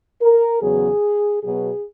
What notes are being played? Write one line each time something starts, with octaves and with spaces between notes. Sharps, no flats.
A#4
E2 C#3 F#3 B3 G#4
B2 F#3 B3 G#4